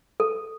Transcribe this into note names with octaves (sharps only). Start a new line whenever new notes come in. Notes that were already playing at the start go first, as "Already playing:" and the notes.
A4